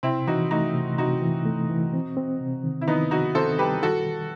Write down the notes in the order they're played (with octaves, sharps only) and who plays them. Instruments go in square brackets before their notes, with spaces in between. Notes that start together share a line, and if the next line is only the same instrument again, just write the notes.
[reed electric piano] C3 [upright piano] C4 E4
[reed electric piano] E3 [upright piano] D#4 F#4
[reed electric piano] A3 [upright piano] D#4 F#4
[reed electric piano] C3
[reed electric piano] C3 [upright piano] D#4 F#4
[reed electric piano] E3
A3
E3
C4
C4
C3
D#3
[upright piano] E4
[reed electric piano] D#3 [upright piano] B3 D#4
[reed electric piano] C3 [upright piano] D#4 F#4
[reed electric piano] C4 [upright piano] A4 C5
[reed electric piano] G3 [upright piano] G4 B4
[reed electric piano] D#3 [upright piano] F#4 A4
[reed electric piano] D#3